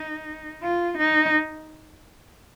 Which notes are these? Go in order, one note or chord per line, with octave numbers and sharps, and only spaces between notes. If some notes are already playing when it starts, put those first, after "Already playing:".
Already playing: D#4
F4
D#4